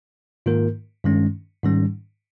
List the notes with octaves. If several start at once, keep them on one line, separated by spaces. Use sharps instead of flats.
G#2 D#3 A#3 F4 A#4
G2 D#3 G#3 C#4
G#2 D#3 G3 C#4